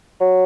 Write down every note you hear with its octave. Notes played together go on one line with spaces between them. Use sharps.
F#3